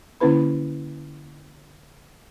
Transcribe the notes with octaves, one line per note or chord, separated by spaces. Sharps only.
D3 A#3 C#4 E4 B4 B5